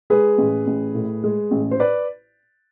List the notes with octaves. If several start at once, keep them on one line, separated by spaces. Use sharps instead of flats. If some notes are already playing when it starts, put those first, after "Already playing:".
G#3 G#4 B4
A1
A1
A2
G#3
A1
C5
B4 D5